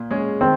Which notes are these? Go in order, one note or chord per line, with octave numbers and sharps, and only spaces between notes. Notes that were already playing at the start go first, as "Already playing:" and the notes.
Already playing: A#2
G#3 C#4 G#4
D#3 C4